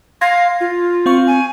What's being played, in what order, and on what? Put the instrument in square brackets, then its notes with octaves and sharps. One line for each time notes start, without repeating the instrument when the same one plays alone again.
[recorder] F5 [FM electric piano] C6 G#6 A#6
[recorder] F4
[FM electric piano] C4 F5 C#6
[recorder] G#5